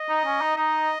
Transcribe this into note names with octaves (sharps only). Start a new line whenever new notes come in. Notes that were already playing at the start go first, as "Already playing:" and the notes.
Already playing: D#5
D#4
C#4
D#4
D#4 D#5